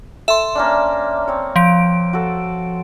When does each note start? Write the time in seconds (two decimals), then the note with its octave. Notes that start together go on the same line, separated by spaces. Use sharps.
0.28 A4 E5 C6
0.55 A#3 C#4 D4
1.28 C4 C#5
1.56 F3 D7
2.13 F#4 A4